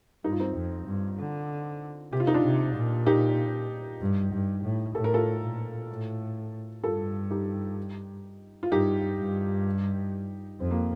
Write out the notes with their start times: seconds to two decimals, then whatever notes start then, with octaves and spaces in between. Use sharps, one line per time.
0.24 G2 D#4
0.32 F4
0.39 C4 D#4
0.56 F2
0.86 G2
1.18 D3
2.12 C3 G4
2.20 F4
2.27 D#4
2.34 D4 F4
2.44 C3
2.75 A#2
3.06 D#4 G4
4.01 G2
4.33 G2
4.64 A2
4.95 A2 A4
5.04 A#4
5.14 F4 A4
5.43 A#2
5.89 A2
6.83 G2 F4 A4
7.30 D#4 G4
8.63 F4
8.72 G2 D#4 G4
9.19 G2
10.60 F2 C4
10.71 A#3